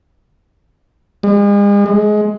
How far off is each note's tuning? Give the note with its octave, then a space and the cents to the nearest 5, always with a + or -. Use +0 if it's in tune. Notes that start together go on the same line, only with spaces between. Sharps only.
G#3 -40
G#3 +20